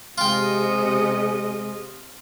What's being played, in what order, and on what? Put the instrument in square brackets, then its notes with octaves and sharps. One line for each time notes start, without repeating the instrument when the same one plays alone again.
[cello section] C3 D#5 [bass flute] G#3 [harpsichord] F4 G5